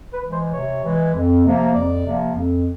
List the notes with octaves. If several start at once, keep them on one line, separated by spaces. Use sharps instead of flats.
B4
E3 G#3
C5
C3 C#5
E3 G#3
F2
C3 F3 A#3
F2 D5
C3 F3 A#3
F2